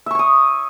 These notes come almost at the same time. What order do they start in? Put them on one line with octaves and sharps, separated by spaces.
E5 C#6 C#5 D#6